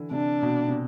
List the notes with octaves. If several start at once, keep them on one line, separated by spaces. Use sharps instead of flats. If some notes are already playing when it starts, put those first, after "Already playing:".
Already playing: D3 E3
C3 D4
B2
C3